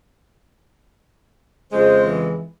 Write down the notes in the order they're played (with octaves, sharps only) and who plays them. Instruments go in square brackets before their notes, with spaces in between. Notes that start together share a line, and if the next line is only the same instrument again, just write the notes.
[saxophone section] F2 C#3 G#3 [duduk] C5
[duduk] E3